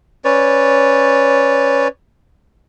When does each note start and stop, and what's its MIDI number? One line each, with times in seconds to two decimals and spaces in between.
0.25 1.88 61
0.25 1.88 71
0.25 1.88 73
0.25 1.88 74